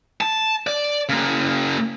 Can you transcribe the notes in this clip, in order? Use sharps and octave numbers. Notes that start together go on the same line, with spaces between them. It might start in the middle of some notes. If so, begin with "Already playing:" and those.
A5
D5
C#3 A#3